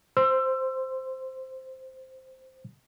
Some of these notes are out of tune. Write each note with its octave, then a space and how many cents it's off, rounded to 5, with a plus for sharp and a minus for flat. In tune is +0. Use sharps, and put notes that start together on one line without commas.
C5 +0 C6 +0 E6 +25